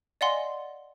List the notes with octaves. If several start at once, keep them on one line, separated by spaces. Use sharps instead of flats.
D5 D#5 F5 F#5 G#5 C6